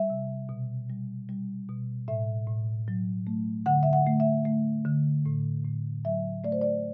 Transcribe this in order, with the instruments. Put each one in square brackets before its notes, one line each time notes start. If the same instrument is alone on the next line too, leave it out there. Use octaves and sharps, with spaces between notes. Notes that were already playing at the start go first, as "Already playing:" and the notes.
Already playing: [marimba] G3 E5
C3
B2
G3
G3
B2
A2 E5
A2
F#3
A3
D3 F#5
E5
F#5
A3
E5
A3
D3
A2
A2
F#3 E5
A3 D5
C5
D5